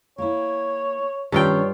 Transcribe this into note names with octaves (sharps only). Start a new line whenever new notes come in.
A#3 E4 C#5
G2 D#3 C#4 D4 F4 C#5 G5